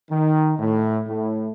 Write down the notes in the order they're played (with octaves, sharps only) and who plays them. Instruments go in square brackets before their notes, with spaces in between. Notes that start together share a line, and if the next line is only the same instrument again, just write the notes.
[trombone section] D#3
A2
A2